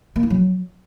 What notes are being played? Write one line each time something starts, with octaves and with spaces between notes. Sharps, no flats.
A#3
E4
F#3